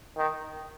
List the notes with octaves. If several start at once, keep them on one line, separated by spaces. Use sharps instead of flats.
D#3